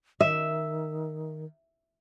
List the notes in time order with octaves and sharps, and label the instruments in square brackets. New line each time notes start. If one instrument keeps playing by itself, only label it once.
[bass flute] D#3 [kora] E5